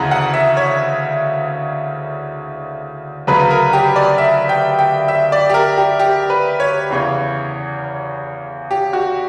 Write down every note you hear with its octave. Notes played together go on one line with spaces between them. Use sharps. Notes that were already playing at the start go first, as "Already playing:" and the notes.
Already playing: D2 C#3 E3 F#5 A#5
F#5
E5
C#5
D2 C#3 F#3 B4
A#4
G4
D5
E5
G5
G5
E5
D5
G4
A#4
G4
G4
B4
C#5
E2 C#3 E3
G4
F#4